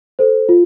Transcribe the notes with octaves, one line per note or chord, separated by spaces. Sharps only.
A4 C5
F4